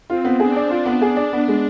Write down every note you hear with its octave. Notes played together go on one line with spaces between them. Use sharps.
C4 F4
B3
D4 G#4
D5
D4 F4
B3
G#4
D5
B3
G#3